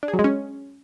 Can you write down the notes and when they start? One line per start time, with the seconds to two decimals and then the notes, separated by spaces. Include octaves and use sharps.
0.03 D4
0.08 G#4
0.14 F#3
0.19 G#3
0.24 C#4